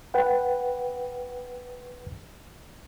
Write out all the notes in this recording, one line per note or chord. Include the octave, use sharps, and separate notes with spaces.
B4 F#5 G5